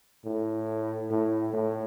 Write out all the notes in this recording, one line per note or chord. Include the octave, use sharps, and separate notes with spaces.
A2
A2
A2